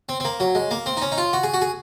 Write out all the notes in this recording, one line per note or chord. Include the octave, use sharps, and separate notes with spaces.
C4
C4
A#3
F#3
G#3
A#3
C4
D#4
C#4
D#4
F4
F#4
G#4
F#4
G#4